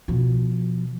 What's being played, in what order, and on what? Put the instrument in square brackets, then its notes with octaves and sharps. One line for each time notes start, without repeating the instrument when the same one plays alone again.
[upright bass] B2 F3